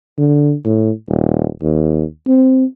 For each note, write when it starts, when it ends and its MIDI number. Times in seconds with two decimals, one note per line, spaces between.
0.18 0.54 50
0.65 0.91 45
1.08 1.48 27
1.62 2.04 39
2.27 2.65 60